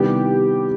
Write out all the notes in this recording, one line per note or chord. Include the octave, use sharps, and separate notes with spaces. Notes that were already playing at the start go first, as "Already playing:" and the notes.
Already playing: C3 D#3 G3 B3 E4 G4